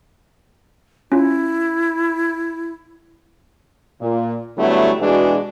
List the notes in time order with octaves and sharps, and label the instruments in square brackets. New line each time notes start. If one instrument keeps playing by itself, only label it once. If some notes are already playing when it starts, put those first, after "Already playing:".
[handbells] C#4 F4 [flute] E4
[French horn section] A#2
D3 F#3 G3 A3 B3 E4
B2 E3 G#3 D4 F#4 G#4